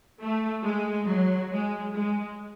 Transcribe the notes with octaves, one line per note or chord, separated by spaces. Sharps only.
A3
G#3
F#3
G#3
G#3